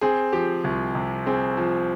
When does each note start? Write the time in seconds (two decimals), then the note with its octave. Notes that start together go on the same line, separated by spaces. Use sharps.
0.01 C4 G#4
0.33 F3 G4
0.64 C2
0.95 C3
1.26 C4 G#4
1.57 F3